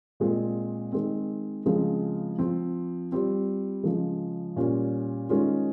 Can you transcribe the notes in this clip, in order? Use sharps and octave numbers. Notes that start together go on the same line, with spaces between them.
A#2 G#3 C4 F4
D#3 G#3 C4
C#3 F3 G#3 C4
F3 C4 F4
G3 C4 F4
C#3 F3 G#3
A#2 G3 C#4 F4
D#3 G#3 C#4 F4